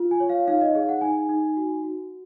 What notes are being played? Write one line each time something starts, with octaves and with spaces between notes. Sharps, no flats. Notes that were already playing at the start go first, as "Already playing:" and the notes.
Already playing: F4
G#5
C#5
F5
D#4 F5
D#5
G#4 F5
F#5
D#4 G#5
D#4
F#4
F#4